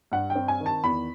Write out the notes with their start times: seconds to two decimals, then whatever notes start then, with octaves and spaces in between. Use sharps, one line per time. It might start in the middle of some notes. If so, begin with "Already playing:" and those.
0.12 G2 F#5
0.30 G5
0.35 C4
0.48 G#5
0.60 D#3
0.66 A5
0.84 E2 B5